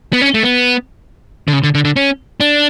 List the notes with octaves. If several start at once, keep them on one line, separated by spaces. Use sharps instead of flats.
B3
C#4
A3
B3
D3
C#3
D3
D3
D3
C#4
D4